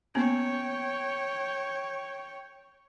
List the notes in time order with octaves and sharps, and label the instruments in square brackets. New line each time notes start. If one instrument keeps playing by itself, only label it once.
[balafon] A#3 B3 C#4 [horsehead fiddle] C#5 G5